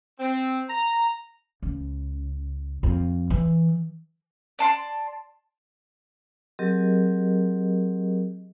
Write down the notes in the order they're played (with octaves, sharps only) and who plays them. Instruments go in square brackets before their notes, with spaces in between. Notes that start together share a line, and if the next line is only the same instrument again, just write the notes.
[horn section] C4
A#5
[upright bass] C#2
F2
E3
[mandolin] D5 A5 C6
[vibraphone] F#3 C4 G4 G#4 A#4 D#5